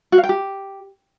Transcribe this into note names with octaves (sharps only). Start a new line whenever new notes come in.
F#4
F5
G5
G4